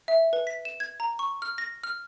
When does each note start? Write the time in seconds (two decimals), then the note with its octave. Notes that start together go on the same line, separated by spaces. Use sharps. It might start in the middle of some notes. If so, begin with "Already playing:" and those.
0.08 E5
0.33 B4
0.47 B6
0.65 E7
0.80 G#6
1.00 A#5
1.19 C#6
1.42 F6
1.58 A#6
1.84 F6